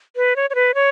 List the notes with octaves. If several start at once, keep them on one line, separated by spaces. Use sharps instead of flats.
B4
C#5
C#5
B4
C#5